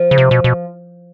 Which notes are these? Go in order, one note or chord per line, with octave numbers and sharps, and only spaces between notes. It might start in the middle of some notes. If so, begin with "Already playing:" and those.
Already playing: F3
C#3
C3
B2
B2